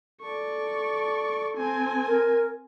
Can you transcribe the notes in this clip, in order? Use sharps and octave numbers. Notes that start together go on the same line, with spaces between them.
A4 D5 C#6
C4 G#5
A#4